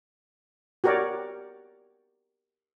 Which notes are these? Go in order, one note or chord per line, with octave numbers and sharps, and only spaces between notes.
F#4 G4 A#4 C#5 D5